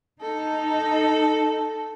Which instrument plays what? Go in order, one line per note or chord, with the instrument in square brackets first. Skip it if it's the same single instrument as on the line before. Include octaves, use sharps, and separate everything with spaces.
[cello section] D#4 [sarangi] A4